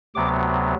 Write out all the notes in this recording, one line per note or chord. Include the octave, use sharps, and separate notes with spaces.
D2 C3 F#3 B3 D6